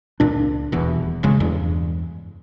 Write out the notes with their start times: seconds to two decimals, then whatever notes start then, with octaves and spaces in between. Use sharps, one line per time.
0.20 C#2 A#2 D4
0.72 D#1 E2 B2
1.23 D1 C#3 G#3
1.40 E2 G2